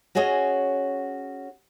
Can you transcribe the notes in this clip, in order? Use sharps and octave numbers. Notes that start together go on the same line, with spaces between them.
C#4 F#4 G#4 C#5 D#5